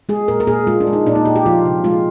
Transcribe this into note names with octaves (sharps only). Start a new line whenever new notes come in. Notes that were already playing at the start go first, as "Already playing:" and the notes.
G#3 G#4
A#2 A#4
A#4
A#2 G#4
G#3 F4
D4
G#3
D#4
A#2 D4
D#4
A#2 G4
G4
F3 F4
C3
G#3 F4